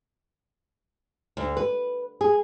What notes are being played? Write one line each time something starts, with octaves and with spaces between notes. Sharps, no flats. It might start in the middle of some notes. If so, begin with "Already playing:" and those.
D2
B4
G#4